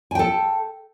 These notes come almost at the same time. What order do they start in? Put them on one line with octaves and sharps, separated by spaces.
G#5 G5 A4